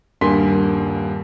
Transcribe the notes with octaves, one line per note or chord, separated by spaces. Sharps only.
D#1 G2 A#3 G#5 C6 B6